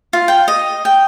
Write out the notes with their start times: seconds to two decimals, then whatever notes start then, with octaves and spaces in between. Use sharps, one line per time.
0.13 F4
0.28 G5
0.48 D#5
0.85 G5